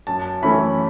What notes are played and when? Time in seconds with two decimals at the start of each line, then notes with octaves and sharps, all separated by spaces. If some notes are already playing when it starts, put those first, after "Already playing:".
0.07 F#2 A5
0.42 E3 A3 C#4 E4 B5